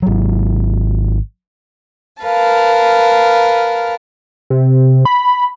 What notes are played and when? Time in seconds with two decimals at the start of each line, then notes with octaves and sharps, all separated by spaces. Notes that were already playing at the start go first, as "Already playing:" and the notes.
0.02 G#1 F#3
2.22 A#4 B4 F5 A5
4.50 C3
5.05 B5